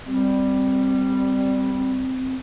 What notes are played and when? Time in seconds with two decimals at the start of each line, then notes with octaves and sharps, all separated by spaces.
0.06 G3 C4